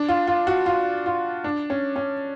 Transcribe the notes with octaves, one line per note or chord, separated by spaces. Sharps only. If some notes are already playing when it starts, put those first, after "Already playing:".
Already playing: D4
F4
F4
F#4
F4
F4
D4
C#4
C#4